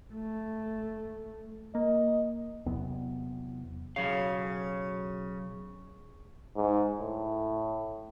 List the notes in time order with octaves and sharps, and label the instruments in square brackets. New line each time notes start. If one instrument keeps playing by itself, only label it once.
[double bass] A3
[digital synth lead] A#3 [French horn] D#5
[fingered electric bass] E2 C3 F#3 B3
[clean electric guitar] B1 F#3 F5 [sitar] C#3
[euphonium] G#2
A2